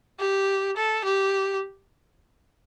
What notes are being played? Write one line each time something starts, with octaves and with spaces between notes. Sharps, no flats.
G4
A4
G4